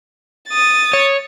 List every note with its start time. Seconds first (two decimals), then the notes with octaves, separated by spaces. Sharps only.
0.49 D#6 A6
0.93 C#5